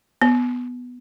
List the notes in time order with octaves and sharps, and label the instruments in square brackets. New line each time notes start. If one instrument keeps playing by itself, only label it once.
[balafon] B3